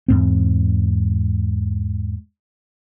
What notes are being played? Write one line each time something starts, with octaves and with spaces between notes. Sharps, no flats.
E2 G#2 C4